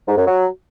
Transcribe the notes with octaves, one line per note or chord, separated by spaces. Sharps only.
G#2
F#2
F#3